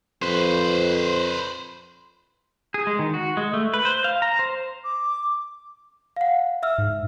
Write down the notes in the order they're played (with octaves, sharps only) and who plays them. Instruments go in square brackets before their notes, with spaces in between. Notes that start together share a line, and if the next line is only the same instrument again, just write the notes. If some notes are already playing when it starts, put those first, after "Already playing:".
[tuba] F2 [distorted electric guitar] B4 C5
[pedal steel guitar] G#4
G#3
D#3
F#4
G#3
A3
B4
C5
F5
A#5
C5
[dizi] D6
[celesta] F5 F#5
E5 E6 F6
[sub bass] G#2